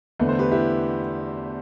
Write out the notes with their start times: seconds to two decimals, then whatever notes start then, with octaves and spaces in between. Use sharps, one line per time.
0.19 E2 D3 A3 B4
0.29 C5
0.39 G4 B4
0.51 E4 G4